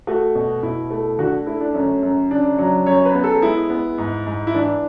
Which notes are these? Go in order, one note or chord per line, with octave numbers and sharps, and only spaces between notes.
A3 F#4
B2
B2 E4
A3
D3 F#4
A3 E4
D4
F#2 C#4
F#2
C#3 D4
F#3
F#2 C#5
B4
B3
A4
G#3 E4
B3
G#2
G#2
E4
E3 D4